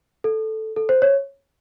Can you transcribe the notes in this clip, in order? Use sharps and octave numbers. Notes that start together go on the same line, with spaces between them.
A4
A4
C5
C#5